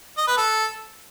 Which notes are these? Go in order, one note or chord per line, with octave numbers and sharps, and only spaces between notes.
D#5
B4
A4